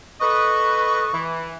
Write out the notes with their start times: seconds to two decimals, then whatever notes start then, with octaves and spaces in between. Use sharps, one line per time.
0.20 A4 B4 D#5 C#6
1.12 E3